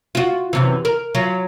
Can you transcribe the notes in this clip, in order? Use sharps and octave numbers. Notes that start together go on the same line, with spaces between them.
F4 F#4
F#2 C3 E3
A#4
F#3 F4